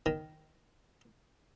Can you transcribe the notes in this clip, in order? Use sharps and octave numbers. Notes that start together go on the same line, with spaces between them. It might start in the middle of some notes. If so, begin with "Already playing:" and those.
D#3